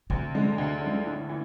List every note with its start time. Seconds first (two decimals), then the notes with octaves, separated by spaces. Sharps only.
0.10 D2 C3
0.35 D3 G#3
0.58 D2
0.82 D3 G#3
1.06 A2
1.29 E3